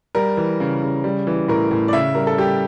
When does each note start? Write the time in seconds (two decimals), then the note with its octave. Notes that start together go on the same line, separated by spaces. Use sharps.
0.15 G3 A#4
0.37 E3
0.60 C#3
0.82 C#3
1.04 G3
1.27 E3
1.48 A2 A#4
1.71 A2
1.88 D5
1.93 C#3 E5
2.15 G3 A#4
2.27 A4
2.38 G3 G4